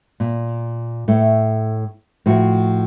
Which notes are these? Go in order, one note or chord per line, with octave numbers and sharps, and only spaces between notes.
A#2
A2 A3
A2 F3 F#4